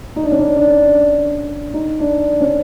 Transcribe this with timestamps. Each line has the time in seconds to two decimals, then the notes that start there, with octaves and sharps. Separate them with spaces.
0.16 D#4
0.23 D4
0.31 C#4
0.39 D4
0.55 D4
1.74 D#4
2.00 D4
2.41 C#4